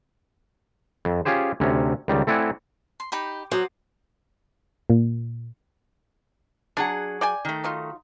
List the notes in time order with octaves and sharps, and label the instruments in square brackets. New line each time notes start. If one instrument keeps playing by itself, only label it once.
[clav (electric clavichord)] F2
C#4 F4 G4 G#4 C5
D2 C3 C#4
C#2 D#3 G3
A3 C4 E4 D5 F#5 G#5
[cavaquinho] C6
D#4 G4 B5
[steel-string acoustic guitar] F#3 [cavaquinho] C5 D6 D#6
[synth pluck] A#2
[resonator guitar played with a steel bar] F#3 G#4 F#5 [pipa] D4
[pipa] D5 G5 G#5
[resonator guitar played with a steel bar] D#3 A3
[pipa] F#3 D#4 F4